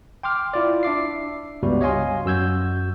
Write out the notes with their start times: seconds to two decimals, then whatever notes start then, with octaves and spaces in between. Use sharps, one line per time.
0.23 G5 C6 D6 F6
0.54 E4 F4 D5
0.83 D4 E5 D6 C7
1.63 C#2 G2 G3 B3 F#4
1.81 C#5 D#5 F5 G#5 C6
2.25 F#2 F#4 E6 G6 G#6